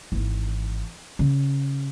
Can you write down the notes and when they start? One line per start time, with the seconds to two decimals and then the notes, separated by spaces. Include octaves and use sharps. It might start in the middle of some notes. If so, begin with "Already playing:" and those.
0.12 G#1 E3
1.19 C#3